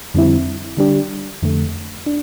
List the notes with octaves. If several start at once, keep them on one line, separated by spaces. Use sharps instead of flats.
F2 D3 G3 C4 E4
D3 G3 D4 G4
F2 D3 A3
D4